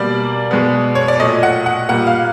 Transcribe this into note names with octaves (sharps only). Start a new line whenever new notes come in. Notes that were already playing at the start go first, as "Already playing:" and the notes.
Already playing: B2 G3 A#3 D5
B2 G#3 B3
C#5
D5
A#2 F#3 A3 D#5
F#5
F#5
A#2 G3 A#3 F#5
F5